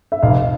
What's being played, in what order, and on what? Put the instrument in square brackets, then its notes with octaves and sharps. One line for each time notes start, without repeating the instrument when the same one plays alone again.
[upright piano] E5
[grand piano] F1 [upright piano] D#5 F5